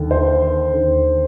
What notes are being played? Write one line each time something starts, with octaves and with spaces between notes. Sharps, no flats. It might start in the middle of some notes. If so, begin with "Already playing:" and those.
Already playing: D#2 D3
C5
D#2 D3